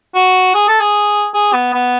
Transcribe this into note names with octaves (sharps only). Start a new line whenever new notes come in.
F#4
G#4
A4
G#4
G#4
B3
B3